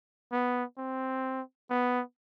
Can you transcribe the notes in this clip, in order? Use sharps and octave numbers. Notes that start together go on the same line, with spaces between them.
B3
C4
B3